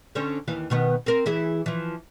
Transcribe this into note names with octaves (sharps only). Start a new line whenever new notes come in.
D3 C#4 C5
D#2 E3 F5
B2 D#3 B3
C4 A#4
E3 E4 G#4
E3 F3